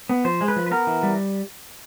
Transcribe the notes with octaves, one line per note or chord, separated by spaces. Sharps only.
B3
F3 C5
G#3
B4
F3
B4
B3 A#4
E3
G3